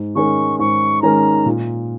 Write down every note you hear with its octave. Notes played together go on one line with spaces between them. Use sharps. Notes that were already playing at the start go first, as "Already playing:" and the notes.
Already playing: G#2
D#3 G#3 C#4 A#4 C#6
G#2 C#6
D#3 G#3 C#4 A#4 A#5
A#2